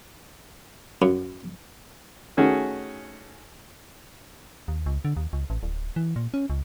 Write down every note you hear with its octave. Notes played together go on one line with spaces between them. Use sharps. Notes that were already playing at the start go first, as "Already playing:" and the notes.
F#2
D#3 A3 C#4 F#4 G#4
D#2
C#2
D3
D#2
C#2
A1
D1
E3
A#2
C#4
C#2